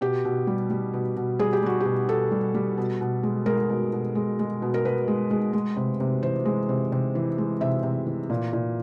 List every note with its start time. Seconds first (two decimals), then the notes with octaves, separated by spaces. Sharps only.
0.01 B2 G4
0.25 B2
0.47 G3
0.70 G3
0.93 B2
1.16 B2
1.39 G3 G#4
1.53 G4
1.63 G3 F#4
1.80 B2 G4
2.08 B2 A4
2.31 G3
2.55 G3
2.77 B2
3.01 B2
3.23 G#3
3.46 G#3 A#4
3.70 B2
3.92 B2
4.15 G#3
4.39 G#3
4.62 B2
4.74 A#4
4.85 B2 B4
5.08 G#3
5.31 G#3
5.53 G#3
5.77 C3
6.00 C3
6.22 E3 C5
6.45 G#3
6.69 C3
6.92 C3
7.15 E3
7.38 G#3
7.61 C3 E5
7.83 C3
8.06 E3
8.30 A#2
8.53 A#2